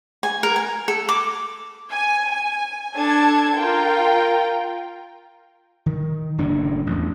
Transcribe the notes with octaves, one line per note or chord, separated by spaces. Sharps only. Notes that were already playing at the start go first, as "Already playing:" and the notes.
G#5
A#4
G#5
A4
D6
G#5
G#5
D4 A4 A5 G#6
F4 A#4 G5
D#3
F#1 F#2 A2 D4
A1 E2